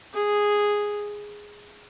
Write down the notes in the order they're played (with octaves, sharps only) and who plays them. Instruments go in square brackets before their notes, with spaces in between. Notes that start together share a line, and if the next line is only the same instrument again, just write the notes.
[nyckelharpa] G#4